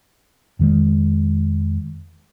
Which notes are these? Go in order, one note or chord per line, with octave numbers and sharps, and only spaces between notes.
F2 D#3 G#3